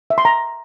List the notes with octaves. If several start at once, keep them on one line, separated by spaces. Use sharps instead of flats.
E5
C6
A#5